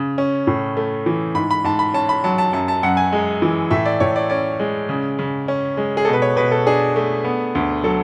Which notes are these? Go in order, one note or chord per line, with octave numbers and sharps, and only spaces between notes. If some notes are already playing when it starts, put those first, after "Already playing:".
Already playing: C#3
C#4
A2
A3
E3
G#2 B5
B5
G#2 A5
B5
C#4 A5
B5
F#3 A5
A5
F#2 A5
A5
F#2 F#5
G#5
G#3
E3
A2 E5
D5
A2 C#5
D5
C#4 D5
G#3
C#3
C#3
C#4
G#3
G#4
B2 A4
B4
C#5
B2 B4
A4
D4 G#4
A3
B3
D2
F#3 A4